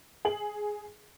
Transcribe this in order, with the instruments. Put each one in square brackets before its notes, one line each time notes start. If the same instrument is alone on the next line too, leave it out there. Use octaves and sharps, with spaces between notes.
[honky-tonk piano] G#4 F#7